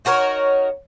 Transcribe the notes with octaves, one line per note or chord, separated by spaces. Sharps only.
D#4 F#4 A#4 C#5